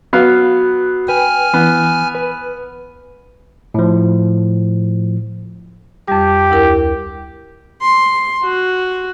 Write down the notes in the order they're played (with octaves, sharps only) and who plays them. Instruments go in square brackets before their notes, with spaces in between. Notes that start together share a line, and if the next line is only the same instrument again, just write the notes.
[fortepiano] F#3 B3 F5
[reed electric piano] B4 G5 [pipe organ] G#5 F6
[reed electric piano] E3 [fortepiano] B3
[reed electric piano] B4
[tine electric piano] A2 F3
[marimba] F2 G3 [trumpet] G4
[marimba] D2 E4 A#4
[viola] C6
F#4